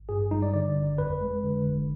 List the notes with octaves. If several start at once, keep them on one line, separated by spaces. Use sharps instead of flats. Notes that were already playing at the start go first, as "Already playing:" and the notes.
Already playing: G#1
G2 G#4
G3 D#4
D5
D3 D5
G1
F2 B4
G#3
D3
G1